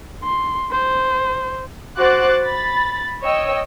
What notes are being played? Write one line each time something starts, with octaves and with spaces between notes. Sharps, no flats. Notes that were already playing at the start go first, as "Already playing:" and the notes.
C6
C5
F#4 C5 D6 F#6 A6
B5 A6
C#5 D#5 G5 E6